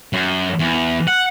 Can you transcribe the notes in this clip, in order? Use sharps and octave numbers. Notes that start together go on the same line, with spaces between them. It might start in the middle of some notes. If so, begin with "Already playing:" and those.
F#2
E2
F#5